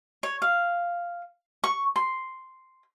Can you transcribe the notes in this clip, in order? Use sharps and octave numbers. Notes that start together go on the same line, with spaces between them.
C#5
F5
C#6
C6